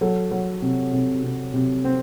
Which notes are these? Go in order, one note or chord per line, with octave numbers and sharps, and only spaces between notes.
F#3 A4
F#3
C3
C3
C3
C3
C4